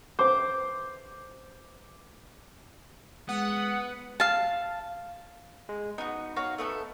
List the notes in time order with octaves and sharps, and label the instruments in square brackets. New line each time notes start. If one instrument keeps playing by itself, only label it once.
[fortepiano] C5 [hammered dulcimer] D6
[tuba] G#3 [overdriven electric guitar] B3 [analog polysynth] F#5 [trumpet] D#6
[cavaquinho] F5 A5
[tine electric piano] G#3
[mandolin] B3 F#4 [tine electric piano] D#4
[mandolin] F#4 C#5 F5
A3 B3 A4